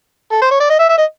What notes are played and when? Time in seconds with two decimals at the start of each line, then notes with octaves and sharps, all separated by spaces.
0.31 A4
0.42 C5
0.51 C#5
0.60 D5
0.70 D#5
0.79 E5
0.89 E5
0.98 D#5